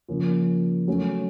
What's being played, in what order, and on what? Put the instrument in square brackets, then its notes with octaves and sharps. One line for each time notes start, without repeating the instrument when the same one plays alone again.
[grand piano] C#3 F3 A#3 C#4 F4
F#3 A3 C#4